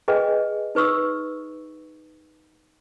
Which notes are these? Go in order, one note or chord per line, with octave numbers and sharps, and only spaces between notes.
G#4 B4 D#5 G5 G#5
D#4 B4 C#6 D#6 E6